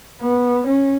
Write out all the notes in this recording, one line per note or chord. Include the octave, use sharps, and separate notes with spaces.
B3
C#4